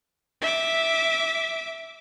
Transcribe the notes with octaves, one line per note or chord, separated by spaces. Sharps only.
E5 D6